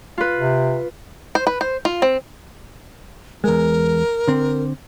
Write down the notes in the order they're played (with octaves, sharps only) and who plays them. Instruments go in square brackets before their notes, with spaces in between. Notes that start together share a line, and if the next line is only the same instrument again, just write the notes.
[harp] F4 B4
[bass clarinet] C3
[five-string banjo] C5
B4
C5
F4
C4
[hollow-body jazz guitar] E2 G#3 [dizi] A#4
[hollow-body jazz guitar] D3 C4